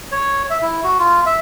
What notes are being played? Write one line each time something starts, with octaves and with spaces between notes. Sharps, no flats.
C#5
E5
E4
F#4
F4
E5